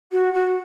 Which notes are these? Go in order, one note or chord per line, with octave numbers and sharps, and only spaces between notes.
F#4
F#4